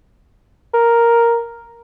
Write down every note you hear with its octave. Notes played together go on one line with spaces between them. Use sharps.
A#4